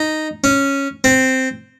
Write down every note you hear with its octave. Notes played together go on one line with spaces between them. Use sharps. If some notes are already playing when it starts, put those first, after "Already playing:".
Already playing: D#4
C#4
C4